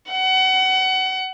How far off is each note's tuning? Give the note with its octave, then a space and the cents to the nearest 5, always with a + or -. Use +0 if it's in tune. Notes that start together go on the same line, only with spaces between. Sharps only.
F#5 +25